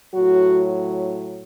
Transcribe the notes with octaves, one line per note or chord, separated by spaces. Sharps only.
A2 F#3 F#4